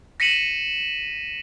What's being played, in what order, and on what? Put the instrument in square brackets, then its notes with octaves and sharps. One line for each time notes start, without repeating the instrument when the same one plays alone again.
[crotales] A#6 B6 C#7 D#7 E7 F#7